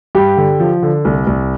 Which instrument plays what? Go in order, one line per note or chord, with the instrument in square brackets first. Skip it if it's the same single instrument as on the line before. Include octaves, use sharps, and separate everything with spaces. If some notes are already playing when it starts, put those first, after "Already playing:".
[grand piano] G2 G4
D3
F3
D3
C2
C2